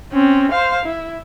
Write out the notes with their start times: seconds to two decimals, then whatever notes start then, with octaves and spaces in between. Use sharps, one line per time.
0.12 C4 C#4
0.52 C5 F5
0.85 E4